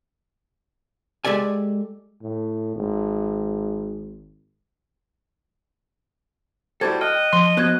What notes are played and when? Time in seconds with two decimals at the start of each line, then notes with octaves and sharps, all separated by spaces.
1.25 G#3 G4 A4 D5 G#5
2.22 A2
2.76 G#1
6.81 G3 E4 F#4 A4 C5 A5 G#6
7.01 D#5 G5 F6 F#6
7.33 F3 C6 G7
7.57 B3 F#4 C5 F#6 G#6